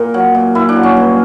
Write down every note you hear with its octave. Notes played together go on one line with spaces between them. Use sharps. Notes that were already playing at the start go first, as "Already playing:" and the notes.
Already playing: A#2 A#4
F#3
A#2
A#2 E4
D4
F#3
C#4
G2